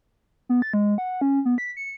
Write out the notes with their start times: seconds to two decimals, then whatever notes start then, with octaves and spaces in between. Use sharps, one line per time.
0.49 B3
0.62 A6
0.74 G#3
0.98 F#5
1.21 C#4
1.45 B3
1.58 B6
1.77 C#7